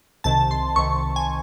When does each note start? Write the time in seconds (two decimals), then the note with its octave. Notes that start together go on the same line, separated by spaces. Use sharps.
0.24 C2 C3 D#3 A5
0.51 C6
0.76 C2 C3 D#3 C#6
1.16 G#5